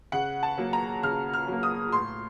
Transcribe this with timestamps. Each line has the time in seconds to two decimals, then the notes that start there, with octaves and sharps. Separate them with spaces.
0.12 C#3 F#5
0.43 A5
0.57 F#3 A#3
0.73 A#5
1.03 C#3 F6
1.33 F6
1.47 F#3 A#3
1.63 D#6
1.92 A2 C6